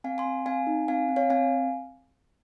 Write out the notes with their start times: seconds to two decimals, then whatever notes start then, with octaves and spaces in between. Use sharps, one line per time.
0.04 C4 F5 G#5
0.18 G#5 C6
0.25 C4
0.46 C4 F5 G#5
0.67 D#4
0.88 C4 F5 G#5
1.09 C4
1.16 C#5 F5
1.30 C4 F5 G#5